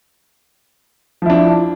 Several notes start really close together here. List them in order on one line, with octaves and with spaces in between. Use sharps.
F3 E4 D4